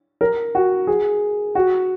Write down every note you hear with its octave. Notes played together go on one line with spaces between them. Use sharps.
A#4
F#4
G#4
F#4